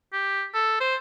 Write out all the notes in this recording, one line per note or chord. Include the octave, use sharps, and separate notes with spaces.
G4
A4
C5